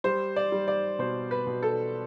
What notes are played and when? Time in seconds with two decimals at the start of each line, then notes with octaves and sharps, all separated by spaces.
0.04 G3 C5
0.36 D5
0.52 G3
0.68 D5
0.99 B2 C5
1.31 B4
1.47 B2
1.62 A4